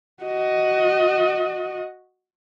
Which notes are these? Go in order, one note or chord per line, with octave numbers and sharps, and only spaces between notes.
F#4 D#5